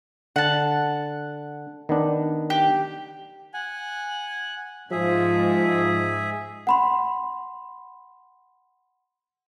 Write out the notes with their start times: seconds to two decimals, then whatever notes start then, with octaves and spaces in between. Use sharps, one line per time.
0.36 D3 F#5 A5
1.89 D#3 B3 D4
2.50 G4
3.54 F#5 G#5
4.91 G#2 F3 G#4 E5
6.67 F#5 B5 C6